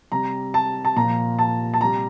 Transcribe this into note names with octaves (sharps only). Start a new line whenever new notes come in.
C3 G3 A#5
A5
A5
A#2 F3 A#5
A5
A5
C3 G3 A#5